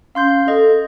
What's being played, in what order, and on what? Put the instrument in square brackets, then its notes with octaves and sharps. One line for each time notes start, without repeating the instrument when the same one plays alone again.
[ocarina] C#4 [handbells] F5 C6 G6
[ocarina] A4 [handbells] D#5